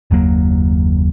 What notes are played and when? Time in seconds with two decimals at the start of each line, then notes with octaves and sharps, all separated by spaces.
0.11 F#1 D#2 F#3 A#3